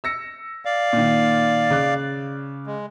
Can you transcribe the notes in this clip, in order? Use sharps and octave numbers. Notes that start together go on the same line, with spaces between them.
E6 A#6 C#7
D5 F5
A#2 D#3
C#3 D6 F#6
G#3